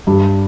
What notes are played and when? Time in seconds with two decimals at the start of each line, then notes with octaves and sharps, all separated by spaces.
0.07 G2